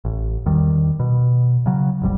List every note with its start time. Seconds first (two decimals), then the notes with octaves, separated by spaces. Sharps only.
0.05 A1
0.46 E2 D#3 G3
1.00 B2
1.66 C#3 F#3
2.02 F1 A#1 G3